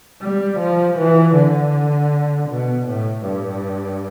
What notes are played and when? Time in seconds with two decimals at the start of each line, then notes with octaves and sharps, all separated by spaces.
0.21 G3
0.59 F3
0.97 E3
1.36 D3
2.49 B2
2.87 A2
3.25 G2